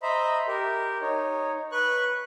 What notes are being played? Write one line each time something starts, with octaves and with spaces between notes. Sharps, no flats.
C5 D#5 E5 A#5 B5
G4 A#4
D#4 C#5
B4 C#6 F#6